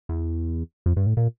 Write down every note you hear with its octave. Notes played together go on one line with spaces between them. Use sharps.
E2
F2
G2
A2
A#2